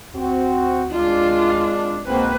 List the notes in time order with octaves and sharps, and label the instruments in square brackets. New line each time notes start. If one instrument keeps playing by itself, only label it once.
[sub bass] D2 [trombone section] C4 F#4
[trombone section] G#1 G#3 D4 [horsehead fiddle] F4
[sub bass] C2 [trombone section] G#2 B2 C4 [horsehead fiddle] A#3 B4